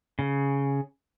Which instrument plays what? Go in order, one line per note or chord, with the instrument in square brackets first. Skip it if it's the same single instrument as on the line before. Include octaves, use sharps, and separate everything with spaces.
[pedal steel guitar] C#3